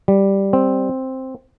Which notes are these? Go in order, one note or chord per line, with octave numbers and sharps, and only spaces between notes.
G3
C4